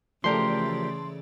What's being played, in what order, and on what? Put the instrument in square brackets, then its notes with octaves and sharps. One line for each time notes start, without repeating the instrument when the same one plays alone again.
[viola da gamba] C#3 [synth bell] E3 A3 D5 [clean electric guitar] F3 G4 A#4 [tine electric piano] C6